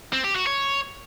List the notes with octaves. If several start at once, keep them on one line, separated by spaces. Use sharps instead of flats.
C4
G4
F#4
C#5